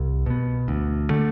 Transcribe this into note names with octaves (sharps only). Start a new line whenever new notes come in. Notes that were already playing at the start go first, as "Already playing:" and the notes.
Already playing: C2
B2 B3
D2
D3 A3